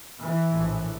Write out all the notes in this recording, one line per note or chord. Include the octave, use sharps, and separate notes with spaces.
E3
A#1 A2